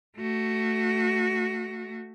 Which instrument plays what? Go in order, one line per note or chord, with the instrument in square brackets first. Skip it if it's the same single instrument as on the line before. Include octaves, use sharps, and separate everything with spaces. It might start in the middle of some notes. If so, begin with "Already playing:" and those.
[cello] A3 F#4